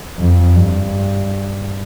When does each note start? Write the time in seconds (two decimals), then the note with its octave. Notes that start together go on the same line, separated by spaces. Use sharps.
0.19 F2
0.55 G2